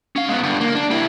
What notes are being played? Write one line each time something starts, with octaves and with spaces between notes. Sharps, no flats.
C#4 F5
G#3 B3
G2 D3
A#3
D4
G3 E4